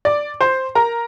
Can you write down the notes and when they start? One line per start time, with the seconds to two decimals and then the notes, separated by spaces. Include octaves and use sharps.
0.05 D5 D6
0.41 C5 C6
0.75 A#4 A#5